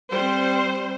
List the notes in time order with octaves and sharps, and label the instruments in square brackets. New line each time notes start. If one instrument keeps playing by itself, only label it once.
[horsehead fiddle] G3 C4 [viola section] C5